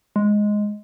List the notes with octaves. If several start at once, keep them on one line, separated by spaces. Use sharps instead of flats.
G#3